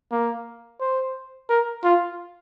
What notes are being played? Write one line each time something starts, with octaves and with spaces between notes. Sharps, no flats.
A#3
C5
A#4
F4